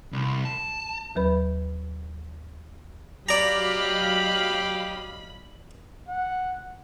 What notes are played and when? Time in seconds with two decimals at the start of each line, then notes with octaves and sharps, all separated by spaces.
0.13 C2
0.45 A5
1.15 D#2 F#3 B4 B5
3.29 F#3 G4 D5 D#5 F5 A#5 B5
6.09 F#5